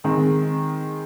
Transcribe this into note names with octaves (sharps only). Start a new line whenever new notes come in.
D#3 G#3 C4